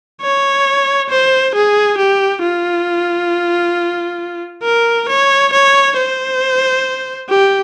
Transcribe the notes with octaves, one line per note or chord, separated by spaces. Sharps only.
C#5
C5
G#4
G4
F4
A#4
C#5
C#5
C5
G4